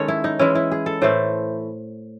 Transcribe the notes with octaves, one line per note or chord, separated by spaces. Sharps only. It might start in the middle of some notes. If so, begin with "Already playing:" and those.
Already playing: D#3 G#3 C#4 A4 C#5
E4
D#4
E3 G#3 C#4 E4
E4
G#4
A4
A2 E3 A3 C5